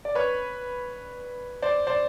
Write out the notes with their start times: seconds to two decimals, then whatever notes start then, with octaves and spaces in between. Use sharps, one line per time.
0.05 D5
0.15 B4 C#5
1.62 C5 D5
1.87 C5 D5